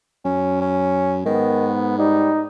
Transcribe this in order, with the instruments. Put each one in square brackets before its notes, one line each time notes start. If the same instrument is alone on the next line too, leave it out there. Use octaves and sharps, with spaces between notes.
[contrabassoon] F#2 [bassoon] C#4
[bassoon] C#4
[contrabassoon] G#2 [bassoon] D#3 [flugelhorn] B3
[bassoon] G3 [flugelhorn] D#4